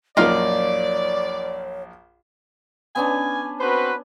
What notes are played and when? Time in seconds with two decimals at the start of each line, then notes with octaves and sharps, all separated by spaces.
0.17 A#1 F#2 A#3 D#4 F4 C#5 D5 F5
2.95 B3 C#4 D4 G#5
3.60 C4 F#4 B4 C5